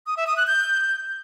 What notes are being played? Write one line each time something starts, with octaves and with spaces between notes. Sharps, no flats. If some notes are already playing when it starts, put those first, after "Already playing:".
D#6
E5
D#6
F#6
G6